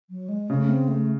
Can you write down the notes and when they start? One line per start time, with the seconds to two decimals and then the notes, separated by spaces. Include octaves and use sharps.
0.10 F#3
0.29 G#3
0.48 C#3 A3
0.69 C4
0.88 A3